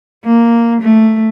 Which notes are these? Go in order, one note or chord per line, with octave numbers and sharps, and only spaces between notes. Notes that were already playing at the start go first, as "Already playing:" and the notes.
A#3
A3